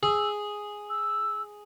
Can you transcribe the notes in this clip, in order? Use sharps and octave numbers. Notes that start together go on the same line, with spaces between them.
G#4 E6
E6